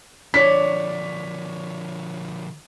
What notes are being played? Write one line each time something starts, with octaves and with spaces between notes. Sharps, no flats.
D3 F3 D4 C#5 B6